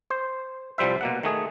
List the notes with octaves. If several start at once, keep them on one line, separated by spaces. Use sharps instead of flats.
C5
C2 F3 G3 C5 E5
B2 A#3 F#5
D#3 A3 G#4